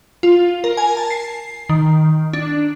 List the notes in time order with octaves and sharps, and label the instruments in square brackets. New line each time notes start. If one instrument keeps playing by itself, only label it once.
[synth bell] F4
A#4
G#5
A5
C7
D#3
D4